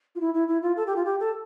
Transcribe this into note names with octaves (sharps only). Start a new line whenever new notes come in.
F4
E4
E4
E4
F4
A4
G4
F4
G4
A4